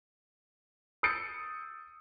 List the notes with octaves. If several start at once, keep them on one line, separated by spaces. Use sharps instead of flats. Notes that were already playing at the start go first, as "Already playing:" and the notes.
D#6 E6 G6 A6 C#7